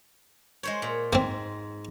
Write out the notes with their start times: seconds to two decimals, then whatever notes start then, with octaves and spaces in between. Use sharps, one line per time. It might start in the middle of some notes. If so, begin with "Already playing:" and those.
0.63 G#3 C5 C#5
0.82 A#2
1.13 G#2 A#3 C4